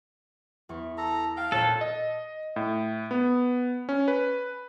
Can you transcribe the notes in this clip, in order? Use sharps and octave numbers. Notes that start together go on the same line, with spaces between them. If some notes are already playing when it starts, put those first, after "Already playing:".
E2 C#6
A4 A#5
F5 G5 A5 F6
A#2 A4 C#5 F#6
D#5
A2
B3
C#4
B4